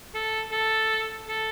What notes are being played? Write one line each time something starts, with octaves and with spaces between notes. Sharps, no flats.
A4
A4
A4